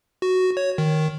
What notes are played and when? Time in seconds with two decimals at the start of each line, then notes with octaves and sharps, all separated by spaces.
0.22 F#4
0.57 C#5
0.78 D#3